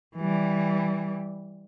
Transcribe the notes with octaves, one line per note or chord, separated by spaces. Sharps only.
E3 G3